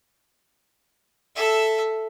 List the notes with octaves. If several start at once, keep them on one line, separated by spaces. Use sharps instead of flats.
A4 E5